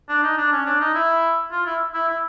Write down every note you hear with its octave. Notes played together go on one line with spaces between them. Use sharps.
D4
D#4
D4
C#4
D4
D#4
E4
F4
E4
E4
E4